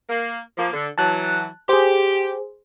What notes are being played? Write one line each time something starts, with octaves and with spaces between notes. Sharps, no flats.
A#3
F3 A#3
D3
E3 F#3 A5 F#6
G4 G#4 C5